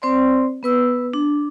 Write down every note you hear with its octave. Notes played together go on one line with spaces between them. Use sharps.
C4 C5 D5 C6
B3 B4 E6
D4